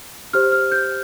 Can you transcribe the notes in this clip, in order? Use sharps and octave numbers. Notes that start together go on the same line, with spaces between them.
G4 C5 F6
F6
G6